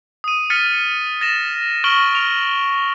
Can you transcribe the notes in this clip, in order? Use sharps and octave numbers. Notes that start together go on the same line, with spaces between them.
D#6 D#7
F6 A6 B6 C#7 D#7
A6 A#6 E7
C#6 F6 A#6 D7 F#7 G7
F6 D7 F7